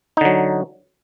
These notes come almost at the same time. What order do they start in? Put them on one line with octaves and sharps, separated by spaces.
D#4 D3 F#3